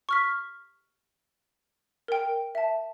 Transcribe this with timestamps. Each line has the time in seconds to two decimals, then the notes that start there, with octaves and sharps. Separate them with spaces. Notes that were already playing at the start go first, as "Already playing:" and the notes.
0.09 C#6 F6 B6
2.08 A#4 G5
2.55 E5 A5